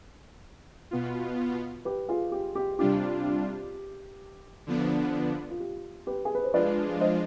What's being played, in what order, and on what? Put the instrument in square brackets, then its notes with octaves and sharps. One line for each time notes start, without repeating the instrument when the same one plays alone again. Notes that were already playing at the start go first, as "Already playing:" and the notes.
[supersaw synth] B2 B3 F4
[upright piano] G4 B4
F4 G#4
G4
G4
[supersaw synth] C3 G3 D4 F4 [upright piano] G4
[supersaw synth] D3 F3 B3 D4
[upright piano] F4
G4
G4 B4
G#4
B4
C5
[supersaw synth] F3 G#3 D4 F4 [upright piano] B4 D5
[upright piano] C5 D#5